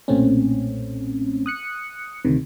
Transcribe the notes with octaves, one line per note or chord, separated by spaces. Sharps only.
B1 A#2 A3 C4 C#4
D#6 F#6 C#7
D2 C3 D#3